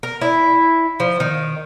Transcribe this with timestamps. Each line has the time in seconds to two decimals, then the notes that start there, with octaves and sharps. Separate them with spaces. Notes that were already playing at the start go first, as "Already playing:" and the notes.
0.03 A#4
0.21 E4
1.00 F3
1.20 D#3